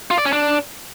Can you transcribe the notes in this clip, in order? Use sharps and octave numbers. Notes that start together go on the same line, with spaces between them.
F4
D5
C#4
D4